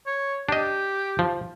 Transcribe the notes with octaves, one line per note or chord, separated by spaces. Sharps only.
C#5
D4 G4 D#5
F3